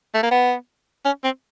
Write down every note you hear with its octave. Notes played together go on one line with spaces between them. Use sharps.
A3
A#3
B3
C#4
C4